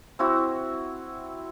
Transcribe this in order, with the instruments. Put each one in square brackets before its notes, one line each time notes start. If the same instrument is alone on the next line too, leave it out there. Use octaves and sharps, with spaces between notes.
[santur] C4 E4 F#4